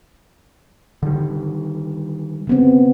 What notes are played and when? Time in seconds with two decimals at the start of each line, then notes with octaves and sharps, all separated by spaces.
1.03 D3 D#3 G3
2.47 C#3 B3 C4